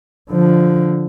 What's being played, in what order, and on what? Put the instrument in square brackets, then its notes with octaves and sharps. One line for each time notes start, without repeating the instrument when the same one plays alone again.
[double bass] D3 F3